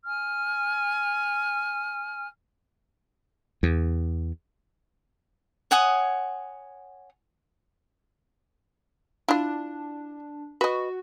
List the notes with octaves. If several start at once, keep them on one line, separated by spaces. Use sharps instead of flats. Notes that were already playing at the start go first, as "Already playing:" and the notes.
G#5 F6
E2
C#5 F#5 G#5 D#6
D4 E4 F4
F#4 B4 D#5